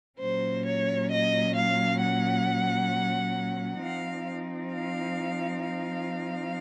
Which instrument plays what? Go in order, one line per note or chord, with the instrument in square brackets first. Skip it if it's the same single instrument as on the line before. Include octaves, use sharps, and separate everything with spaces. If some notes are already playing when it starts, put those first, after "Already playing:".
[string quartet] A#2 F#3 C#4 C5
C#5
D#5
F5
F#5
F3 C4 D#4 F5
F5
F5